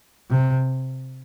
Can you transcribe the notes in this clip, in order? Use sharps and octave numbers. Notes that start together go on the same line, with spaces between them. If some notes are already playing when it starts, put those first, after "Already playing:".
C3